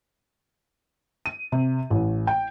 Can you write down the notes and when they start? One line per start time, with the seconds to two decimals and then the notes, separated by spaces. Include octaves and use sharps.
1.26 D#7
1.52 C3
1.90 A1
2.27 G5